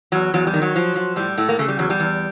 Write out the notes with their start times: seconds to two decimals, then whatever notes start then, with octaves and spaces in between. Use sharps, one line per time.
0.12 E2 F#3
0.34 E2 F#3
0.47 G3
0.54 D#3
0.62 F#3
0.76 F3
0.95 F3
1.16 A2 G3
1.37 A2 A3
1.49 A#3
1.59 C#3 A3
1.68 G3
1.79 E2 F#3
1.90 G3
2.00 E2